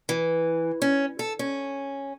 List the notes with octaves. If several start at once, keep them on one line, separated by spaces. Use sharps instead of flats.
E3
C#4
A4
C#4